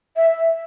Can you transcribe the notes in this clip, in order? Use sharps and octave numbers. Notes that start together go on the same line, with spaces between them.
E5